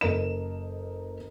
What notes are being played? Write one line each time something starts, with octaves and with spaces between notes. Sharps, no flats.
F#1 A4 A#4 D#5 E7